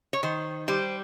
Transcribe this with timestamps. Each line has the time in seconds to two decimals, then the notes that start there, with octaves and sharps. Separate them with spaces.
0.13 C#5
0.23 D#3 C5
0.68 G3 C5